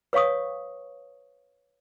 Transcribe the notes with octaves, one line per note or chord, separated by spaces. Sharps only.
B4 C#5 F5 C#6 D#6